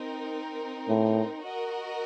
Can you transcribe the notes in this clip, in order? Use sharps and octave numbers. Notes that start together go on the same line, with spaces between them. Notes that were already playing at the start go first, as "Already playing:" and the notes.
Already playing: C4 D#4 A#4
A2
F#4 A#4 D#5